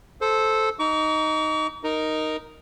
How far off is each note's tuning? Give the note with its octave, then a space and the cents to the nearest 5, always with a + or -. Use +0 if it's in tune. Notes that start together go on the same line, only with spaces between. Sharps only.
A4 -10 C5 +0
D#4 +0 C#6 +45
D#4 +0 A#4 +0